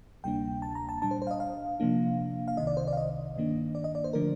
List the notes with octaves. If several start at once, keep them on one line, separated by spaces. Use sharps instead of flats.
D2 C3 G3 A#3 D4 G5
A5
A#5
A5
A#2 G3 D4 A5
C5
C5
F5
D#5
F5
C3 F3 A#3 D4
F5
C2 C3 D#3 D#5
D5
C5
D5
F5
D#5
G2 D#3 A#3 D4
D5
D#5
D5
C5
D3 F3 A3 D4 A#4